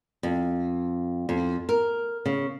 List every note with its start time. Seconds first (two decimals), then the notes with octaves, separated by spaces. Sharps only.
0.23 F2
1.29 F2
1.69 A#4
2.26 C#3